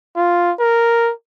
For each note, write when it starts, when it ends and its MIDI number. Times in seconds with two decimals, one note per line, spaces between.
0.16 0.52 65
0.60 1.12 70